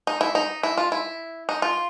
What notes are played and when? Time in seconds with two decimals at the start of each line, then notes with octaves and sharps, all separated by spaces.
0.07 D#4
0.21 E4
0.35 D#4
0.63 E4
0.77 F4
0.92 E4
1.49 D#4
1.62 F4